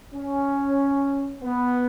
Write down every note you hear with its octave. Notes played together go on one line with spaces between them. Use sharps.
C#4
B3